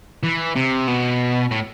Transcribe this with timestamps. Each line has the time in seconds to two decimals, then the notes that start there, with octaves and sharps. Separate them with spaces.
0.23 E3
0.56 C3
0.88 B2
1.51 A2